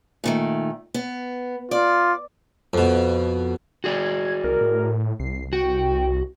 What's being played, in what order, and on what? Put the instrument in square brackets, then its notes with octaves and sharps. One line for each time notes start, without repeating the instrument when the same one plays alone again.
[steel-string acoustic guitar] A#2 D#3 A3
B3
[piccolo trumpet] F4 [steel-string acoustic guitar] D5
[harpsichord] F2 B2
[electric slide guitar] F#4 G#4 D5 [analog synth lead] G#6
[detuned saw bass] C2 [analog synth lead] A#4
[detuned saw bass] A2
[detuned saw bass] C2 [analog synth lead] C7
[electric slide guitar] F#4 [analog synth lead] G5